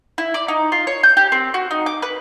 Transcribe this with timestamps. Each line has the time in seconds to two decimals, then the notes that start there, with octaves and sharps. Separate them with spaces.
0.18 E4
0.34 D5
0.48 D#4
0.72 F4
0.87 C#5
1.03 G6
1.17 G4
1.32 C4
1.54 F#4
1.71 D#4
1.86 D6
2.02 B4